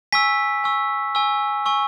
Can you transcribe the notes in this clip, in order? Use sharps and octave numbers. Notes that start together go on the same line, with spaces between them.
G#5 C#6 E6 B6
G#5 C#6 E6
G#5 C#6 E6
G#5 C#6 E6